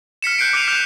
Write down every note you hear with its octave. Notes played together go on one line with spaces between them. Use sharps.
F6 B6 C#7 E7
F#6 G6 C7 D7
D6 F#6 B6 C7 D#7 F7
F6 G6 F7